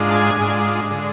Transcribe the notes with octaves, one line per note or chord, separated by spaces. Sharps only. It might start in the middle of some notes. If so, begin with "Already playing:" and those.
Already playing: G#2 G#3 D4 F4
A5
G#5
G#2 G#3 D4 F4
D3 G#3